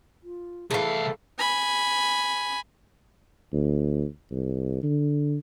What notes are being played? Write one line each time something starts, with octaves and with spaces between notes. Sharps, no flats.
F4
C2 E3 A3 G#4 A4 F5
G#5 B5
D2
C2
D3